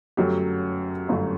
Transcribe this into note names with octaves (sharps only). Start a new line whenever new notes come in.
G1 F#2 F#3 A3 G4
G1 F#2 F#3 A3